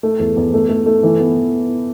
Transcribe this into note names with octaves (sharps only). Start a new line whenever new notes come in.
A3
E2
E2
A3
A3
A3
E3
B3